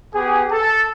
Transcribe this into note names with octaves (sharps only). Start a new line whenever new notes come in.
B3 G4 G#4
A4 A5